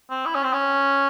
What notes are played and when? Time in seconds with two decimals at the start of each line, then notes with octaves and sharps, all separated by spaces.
0.10 C4
0.26 E4
0.35 C#4
0.44 C4
0.53 C#4